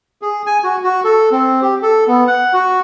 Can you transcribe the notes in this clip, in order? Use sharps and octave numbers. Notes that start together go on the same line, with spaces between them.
G#4
G#5
F#4
F#4
A4
C4
G4
A4
B3
F#5
F#4